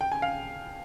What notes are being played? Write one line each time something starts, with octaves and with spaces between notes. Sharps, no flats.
G5
G#5
F5